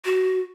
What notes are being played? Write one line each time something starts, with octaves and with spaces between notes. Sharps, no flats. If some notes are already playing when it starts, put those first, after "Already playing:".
F#4